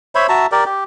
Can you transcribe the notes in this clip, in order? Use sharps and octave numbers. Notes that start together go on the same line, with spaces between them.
C5 C#5 E5 B5
F#4 E5 A5 A#5
G4 A#4 D5
G4